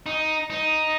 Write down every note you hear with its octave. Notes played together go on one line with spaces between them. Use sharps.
D#4
D#4